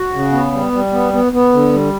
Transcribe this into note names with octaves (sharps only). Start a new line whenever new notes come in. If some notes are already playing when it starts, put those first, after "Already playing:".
Already playing: F#4
C#3
B3
G3
G3
B3
B3
B3
D3
G3